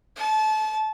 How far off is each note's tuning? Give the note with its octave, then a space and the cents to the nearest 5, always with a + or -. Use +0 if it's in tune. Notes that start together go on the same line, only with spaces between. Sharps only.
A5 -30